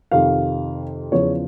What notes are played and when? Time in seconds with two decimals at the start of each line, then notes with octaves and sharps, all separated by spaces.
0.12 F2 C3 D#3 F5
1.12 E2 C#3 F3 C#5